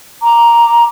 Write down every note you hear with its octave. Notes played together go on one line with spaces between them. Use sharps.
A#5 D6